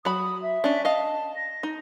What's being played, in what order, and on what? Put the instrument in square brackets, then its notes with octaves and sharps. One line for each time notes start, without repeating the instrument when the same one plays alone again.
[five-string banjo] F#3 B5 [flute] D#6
[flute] E5
[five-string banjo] C#4 D4
[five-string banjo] D#5 F5 [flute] A5
[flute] A#6
[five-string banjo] D#4